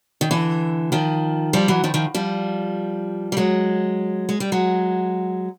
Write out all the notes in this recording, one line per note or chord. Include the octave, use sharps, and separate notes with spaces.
D#3
D3 E3
D#3 F3
F3 G3
E3 F#3
D#3 F3
D#3 F3
F3 G3
G3
F#3 G#3
G#3
G3
F#3 G#3